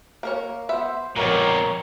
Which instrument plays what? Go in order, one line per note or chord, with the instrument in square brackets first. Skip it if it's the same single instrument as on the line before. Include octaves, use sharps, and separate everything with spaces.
[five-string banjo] A#3 A#4 C#5
[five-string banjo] B3 E5 B5 [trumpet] C5
[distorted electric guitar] F2 A#2 [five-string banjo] B3 G4 [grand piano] A#4 [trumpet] C#5